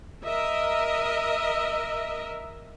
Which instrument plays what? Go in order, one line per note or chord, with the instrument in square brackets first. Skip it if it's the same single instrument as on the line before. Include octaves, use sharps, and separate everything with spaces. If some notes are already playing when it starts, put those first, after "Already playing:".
[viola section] A#4 D#5 E5